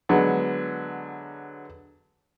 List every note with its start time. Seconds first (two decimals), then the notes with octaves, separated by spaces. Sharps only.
0.09 D3 F#3 G#3 B3